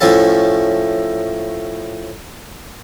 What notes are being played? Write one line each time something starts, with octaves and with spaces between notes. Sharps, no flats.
A2 F3 A3 C#4 A4 A5